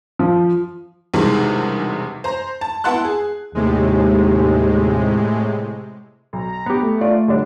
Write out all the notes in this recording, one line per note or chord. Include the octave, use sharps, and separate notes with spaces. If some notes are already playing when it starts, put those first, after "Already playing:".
F3
B1 E2 G2 C3 D#3 G#3
C5 A#5
A5
B3 E4 F#5 A5 C6 F#6
G#4
D#2 A2 C3 G#3
B1 A#5
B3 G4
A3
F4 D5
D3 G3 D4